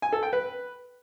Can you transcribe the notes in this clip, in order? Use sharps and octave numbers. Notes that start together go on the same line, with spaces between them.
G#5
A4
G5
B4